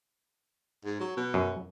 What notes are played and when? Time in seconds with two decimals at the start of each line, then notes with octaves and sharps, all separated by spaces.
0.85 G#2
1.00 F#3
1.17 B2
1.34 F#2